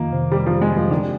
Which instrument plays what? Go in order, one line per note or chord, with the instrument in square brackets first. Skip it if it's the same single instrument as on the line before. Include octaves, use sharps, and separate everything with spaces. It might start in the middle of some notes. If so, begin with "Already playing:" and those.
Already playing: [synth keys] F2 D#3 [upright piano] A#3
[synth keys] C3
[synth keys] C3 [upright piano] G3
[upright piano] F3
[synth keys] C3
[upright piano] G#3
[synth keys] C3
[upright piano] F3
[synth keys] D3 [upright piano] D#3